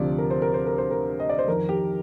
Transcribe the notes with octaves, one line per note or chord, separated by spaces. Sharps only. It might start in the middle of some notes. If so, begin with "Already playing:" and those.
Already playing: D2 C3 F3 D5
A#4
C5
A#4
C5
A#4
C5
A#4
D#5
D5
C5
F2 D#3 A#4
G4